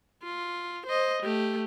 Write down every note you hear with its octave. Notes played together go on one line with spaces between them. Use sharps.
F4
C5 D#5
A3 G4